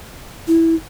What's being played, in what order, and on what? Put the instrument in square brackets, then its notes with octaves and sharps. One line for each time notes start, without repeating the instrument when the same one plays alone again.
[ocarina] E4